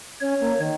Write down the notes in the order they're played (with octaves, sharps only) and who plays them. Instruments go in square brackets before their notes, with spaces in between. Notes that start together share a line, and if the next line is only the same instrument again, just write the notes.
[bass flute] C#4 [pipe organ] C#5
[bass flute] A#3
D#3